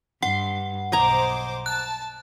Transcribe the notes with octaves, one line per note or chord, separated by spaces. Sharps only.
G2 F#5 C6
B1 C5 D#5 G#5 A#5 D6
A5 F#6